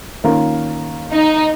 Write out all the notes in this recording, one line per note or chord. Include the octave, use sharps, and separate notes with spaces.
D#3 A#3 C#4 F4 A#4
D#4